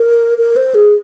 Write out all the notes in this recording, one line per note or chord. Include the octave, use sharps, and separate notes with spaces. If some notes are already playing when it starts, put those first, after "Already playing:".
Already playing: A#4
A#4
C5
G#4